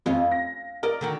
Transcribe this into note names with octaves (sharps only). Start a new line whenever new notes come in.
F2 C#4 F4
A#6
A#4 D5 D#5
D3 D#3 F#4